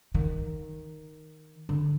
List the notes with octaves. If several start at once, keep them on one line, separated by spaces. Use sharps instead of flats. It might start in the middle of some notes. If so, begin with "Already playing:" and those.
D#3
D3